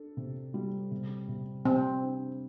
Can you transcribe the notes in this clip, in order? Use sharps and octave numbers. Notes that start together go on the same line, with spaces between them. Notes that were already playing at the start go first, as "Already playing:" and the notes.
Already playing: D4 A4
C3
G3
C3
C3
C3 C4
D4